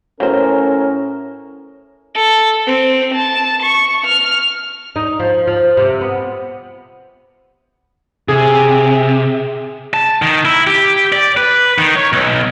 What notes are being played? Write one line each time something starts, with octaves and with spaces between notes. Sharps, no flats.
A2 F#3 C#4 A#4 C5
A4
C4
A5
C#6
F6
D#4
F3
F3
C3
B3
C3 G#4
A5
D#3
E4
G4
D5
B4
D#3
C#5
B1